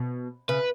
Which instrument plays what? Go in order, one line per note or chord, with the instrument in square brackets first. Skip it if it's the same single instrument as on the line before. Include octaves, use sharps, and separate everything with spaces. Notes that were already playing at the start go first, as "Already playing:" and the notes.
Already playing: [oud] B2
[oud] C#3 [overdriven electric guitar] B4